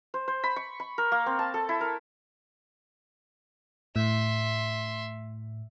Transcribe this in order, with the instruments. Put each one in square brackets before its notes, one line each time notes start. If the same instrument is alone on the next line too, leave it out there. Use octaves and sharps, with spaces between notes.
[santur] C5
C5
B5
C#6
B5
A#4
A#3
C4
A5
A4
E4
A#4
[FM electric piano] A2 [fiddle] E5 C6